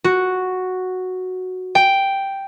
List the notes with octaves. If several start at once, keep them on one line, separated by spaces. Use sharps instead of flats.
F#4
G5